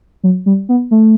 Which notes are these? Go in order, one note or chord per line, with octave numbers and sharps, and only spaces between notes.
F#3
G3
B3
A3